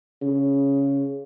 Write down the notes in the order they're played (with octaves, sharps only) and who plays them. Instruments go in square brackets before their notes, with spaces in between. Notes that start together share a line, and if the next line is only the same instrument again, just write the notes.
[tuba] C#3